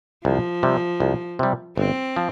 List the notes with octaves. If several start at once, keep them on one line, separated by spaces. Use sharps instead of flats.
C2 F3
C3 G3
C2
C3 G3
G1 C4
F3